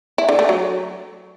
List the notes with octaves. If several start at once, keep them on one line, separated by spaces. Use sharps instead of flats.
E4
D3
A3
F#3